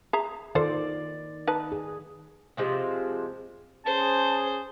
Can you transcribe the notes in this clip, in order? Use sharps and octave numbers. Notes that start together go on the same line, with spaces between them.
G#4 E5 A#5
D#3 F4 A4 C5 D5
D#4 B4 A5
G#4
C3 F3 G#3 C4
C#4 G#4 C5 A5